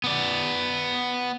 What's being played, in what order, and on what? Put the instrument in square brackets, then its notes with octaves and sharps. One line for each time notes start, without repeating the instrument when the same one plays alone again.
[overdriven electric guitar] B3 D5